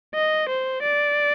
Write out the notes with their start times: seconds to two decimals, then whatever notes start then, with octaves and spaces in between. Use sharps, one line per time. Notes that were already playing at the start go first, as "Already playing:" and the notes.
0.15 D#5
0.49 C5
0.82 D5